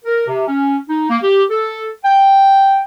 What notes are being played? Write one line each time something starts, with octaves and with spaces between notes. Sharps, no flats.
A#4
C3
C#4
D#4
A#3
G4
A4
G5